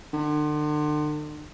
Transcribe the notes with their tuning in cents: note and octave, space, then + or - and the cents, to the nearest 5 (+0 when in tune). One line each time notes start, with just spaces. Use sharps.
D3 +40